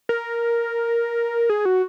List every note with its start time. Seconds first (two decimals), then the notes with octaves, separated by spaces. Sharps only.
0.09 A#4
1.50 G#4
1.65 F#4